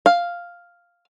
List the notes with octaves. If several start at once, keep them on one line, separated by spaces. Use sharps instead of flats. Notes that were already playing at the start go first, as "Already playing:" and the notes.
F5